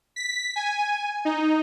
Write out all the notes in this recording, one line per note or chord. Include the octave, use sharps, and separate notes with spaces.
B6
G#5
D#4